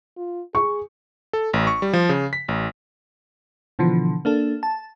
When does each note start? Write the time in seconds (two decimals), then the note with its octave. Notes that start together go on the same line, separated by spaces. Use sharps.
0.17 F4
0.55 G#4 C#6
1.33 A4
1.53 A1
1.67 C#6
1.82 G3
1.93 F3
2.09 C#3
2.33 B6
2.48 A1
3.79 B2 D3 E3 F3
4.25 A#3 D4 A4
4.63 A5